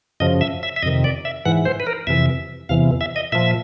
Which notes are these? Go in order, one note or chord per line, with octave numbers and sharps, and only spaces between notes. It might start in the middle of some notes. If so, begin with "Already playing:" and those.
F#2 C#3 F3 D#5
E5
E5
E5
F2 C3 D#3 D#5
D5
E5
G#2 E3 F#5
C5
B4
A#4
F2 C3 E3 E5
E2 C3 E3 F5
E5
D#5
A#2 F3 E5